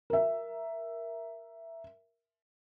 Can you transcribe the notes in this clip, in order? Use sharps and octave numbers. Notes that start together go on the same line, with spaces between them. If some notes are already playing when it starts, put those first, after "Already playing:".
A#4 E5